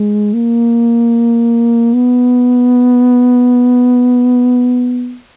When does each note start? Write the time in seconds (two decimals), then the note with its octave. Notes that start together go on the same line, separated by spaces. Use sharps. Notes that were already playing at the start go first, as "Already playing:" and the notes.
Already playing: G#3
0.34 A#3
1.94 B3